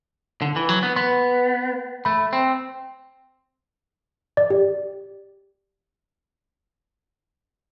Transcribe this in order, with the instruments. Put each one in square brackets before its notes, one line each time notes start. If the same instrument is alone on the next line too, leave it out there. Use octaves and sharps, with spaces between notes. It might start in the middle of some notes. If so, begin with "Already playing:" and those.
[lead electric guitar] D3
E3
F#3
B3
[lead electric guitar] B3 [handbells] C6
[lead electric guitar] A3 [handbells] B5
[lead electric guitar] C4
[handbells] D5
G4